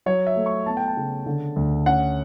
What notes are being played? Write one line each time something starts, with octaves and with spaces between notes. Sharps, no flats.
F#3 C#5
E5
A3
C#6
B3 A5
G5
A5
C#3
D3
D2
C#4 F#5